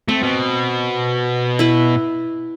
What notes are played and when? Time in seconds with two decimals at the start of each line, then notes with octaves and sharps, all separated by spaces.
0.09 A3 C4
0.23 B2
1.59 E4 B4